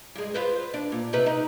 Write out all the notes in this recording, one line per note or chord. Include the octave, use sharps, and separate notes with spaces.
G2 G#3
F4 B4 C5
D4
A#2
C3 D#4 B4
D#4